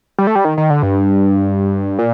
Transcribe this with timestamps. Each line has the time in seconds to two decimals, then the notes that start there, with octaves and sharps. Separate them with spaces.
0.19 G3
0.27 A3
0.35 G3
0.45 D#3
0.58 D#3
0.70 D3
0.83 G2
1.99 A#2